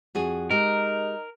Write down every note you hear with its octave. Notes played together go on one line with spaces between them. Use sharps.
F2 F#4 G#4
G#3 D#4 G4 A#4